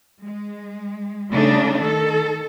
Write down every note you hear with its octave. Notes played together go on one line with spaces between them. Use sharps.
G#3
C#3 G3 A3 D4 D#4
D#3 A4